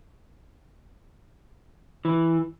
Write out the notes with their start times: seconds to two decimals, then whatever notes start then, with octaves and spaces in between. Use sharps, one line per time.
2.05 E3